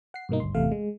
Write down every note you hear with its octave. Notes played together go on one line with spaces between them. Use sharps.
F#5 C7
G2 B2 A#3 D#4
G#1 D2 G2 C6
G1 E2 C3 A3 F5
G#3